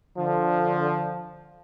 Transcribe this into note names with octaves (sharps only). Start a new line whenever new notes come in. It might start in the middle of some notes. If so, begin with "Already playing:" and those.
D3 F3